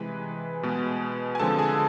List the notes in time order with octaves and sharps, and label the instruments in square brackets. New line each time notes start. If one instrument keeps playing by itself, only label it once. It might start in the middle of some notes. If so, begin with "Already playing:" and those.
Already playing: [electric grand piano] C3 E3 G#3 B4 B5
B2 G#3 B3
G#5
D3 F3 G#3 C4 A4 A5
G#4 G#5